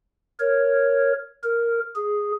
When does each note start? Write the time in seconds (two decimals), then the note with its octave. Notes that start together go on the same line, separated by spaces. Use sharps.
0.40 A#4 C#5
1.43 A#4
1.95 G#4